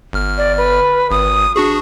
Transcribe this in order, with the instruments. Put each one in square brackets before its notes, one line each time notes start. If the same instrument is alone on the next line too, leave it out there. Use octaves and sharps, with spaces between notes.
[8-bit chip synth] G1 F6
[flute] D5
B4
[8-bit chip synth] G#1 [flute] D#6
[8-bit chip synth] D4 F#4 G#4 [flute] C#6